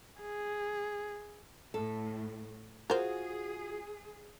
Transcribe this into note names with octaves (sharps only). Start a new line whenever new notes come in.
G#4
A2 A4
F4 F#4 G#4 A#4 C5